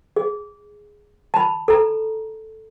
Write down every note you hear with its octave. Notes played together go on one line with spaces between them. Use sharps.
G#4
A5 B5
A4 A#5